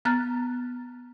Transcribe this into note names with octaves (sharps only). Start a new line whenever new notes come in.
B3 A#5 F6 F#6 A6